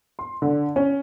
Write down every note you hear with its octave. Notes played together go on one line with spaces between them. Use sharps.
C6
D3
C#4